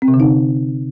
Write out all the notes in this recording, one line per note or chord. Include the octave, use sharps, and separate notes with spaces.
C4
C3
D3
D#4